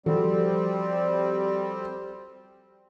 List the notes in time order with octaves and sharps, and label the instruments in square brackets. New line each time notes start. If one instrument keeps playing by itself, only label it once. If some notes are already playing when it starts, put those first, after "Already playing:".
[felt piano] F3 F#4 A4 [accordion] G3 C4